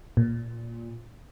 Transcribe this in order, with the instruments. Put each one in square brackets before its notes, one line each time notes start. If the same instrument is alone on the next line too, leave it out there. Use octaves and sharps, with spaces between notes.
[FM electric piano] A#2